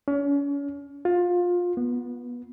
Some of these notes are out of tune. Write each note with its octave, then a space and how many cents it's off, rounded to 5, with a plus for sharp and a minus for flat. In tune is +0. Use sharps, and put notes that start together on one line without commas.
C#4 +35
F4 +20
B3 -20